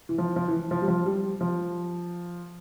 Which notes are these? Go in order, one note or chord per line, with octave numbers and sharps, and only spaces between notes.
E3
F3
F3
E3
F3
G3
F3
G3
F3